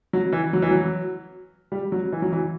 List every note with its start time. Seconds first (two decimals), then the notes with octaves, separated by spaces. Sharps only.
0.13 F#3
0.33 E3
0.53 F#3
0.62 E3
0.71 F#3
1.72 G3
1.92 F#3
2.12 E3
2.22 F#3
2.32 E3